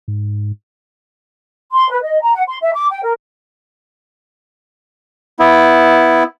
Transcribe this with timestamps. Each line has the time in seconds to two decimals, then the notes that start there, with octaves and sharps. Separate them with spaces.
0.08 G#2
1.72 C6
1.89 B4
2.02 D#5
2.22 A#5
2.34 F#5
2.48 C6
2.61 E5
2.74 D6
2.90 G5
3.03 A#4
5.39 B3 E4